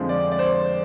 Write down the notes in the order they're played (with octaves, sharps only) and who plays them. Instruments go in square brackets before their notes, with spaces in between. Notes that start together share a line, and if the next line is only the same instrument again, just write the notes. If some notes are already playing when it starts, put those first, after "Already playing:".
Already playing: [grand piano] F2 D3 F3 G#3 C5
D5
D5
C5